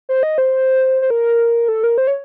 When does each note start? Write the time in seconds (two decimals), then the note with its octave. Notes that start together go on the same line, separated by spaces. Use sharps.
0.09 C5
0.23 D#5
0.38 C5
1.02 C5
1.10 A#4
1.68 A4
1.84 A#4
1.98 C5
2.07 C#5